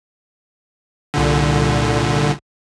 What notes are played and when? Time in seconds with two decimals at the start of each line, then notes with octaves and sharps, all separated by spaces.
1.14 C2 A#2 D3